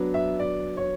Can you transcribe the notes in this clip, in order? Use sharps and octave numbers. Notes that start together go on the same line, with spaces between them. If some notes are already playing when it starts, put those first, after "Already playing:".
Already playing: F#3 B3 D4
E5
D5
C#5